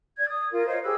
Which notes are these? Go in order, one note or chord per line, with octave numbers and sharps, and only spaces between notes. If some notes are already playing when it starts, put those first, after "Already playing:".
D5 G#6
D#6
F4 A#4
C5 C#5 D#5 F5
G4 G#4 B4 E6